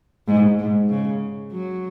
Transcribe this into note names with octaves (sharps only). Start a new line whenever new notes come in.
G#2
G#2
C#3
F#3